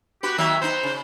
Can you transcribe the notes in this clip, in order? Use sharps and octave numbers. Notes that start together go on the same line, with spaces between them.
B3 F#4 G4 B4
D#3 F#3 A#3 E5
B3 D#4 C5
C#3